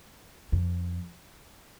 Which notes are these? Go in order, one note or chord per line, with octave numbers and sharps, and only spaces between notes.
F2